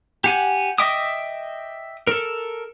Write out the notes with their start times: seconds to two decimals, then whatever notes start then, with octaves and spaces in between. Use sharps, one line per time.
0.24 G4 F#5 G#5
0.78 D#5 E5 G5 D6 D#6
2.07 A4 A#4